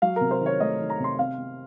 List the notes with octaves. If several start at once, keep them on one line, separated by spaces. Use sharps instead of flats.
F#3 F5
C3 A#4
C5
D#3
C#5
A3 D#5
D#3
A#5
C3 C6
C4 F5
C4